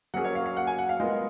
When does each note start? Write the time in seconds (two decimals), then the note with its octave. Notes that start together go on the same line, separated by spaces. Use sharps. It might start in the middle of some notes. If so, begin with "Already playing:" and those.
0.14 F#3 A#3 C#4 G#4 F#5
0.24 C#5
0.35 F5
0.46 F5
0.57 F#5
0.67 G#5
0.78 F#5
0.89 F5
1.00 G#3 B3 F4 A#4 D#5